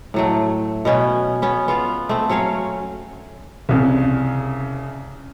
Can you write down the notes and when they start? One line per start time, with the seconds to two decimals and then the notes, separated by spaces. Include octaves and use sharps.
0.14 A2 F#3 A3
0.85 B2 B3 C#4
1.42 B3 C#4
1.68 B3 F4 F5
2.09 A3 C4
2.30 F#3 C#4 C#5 F5
3.69 C2 C#3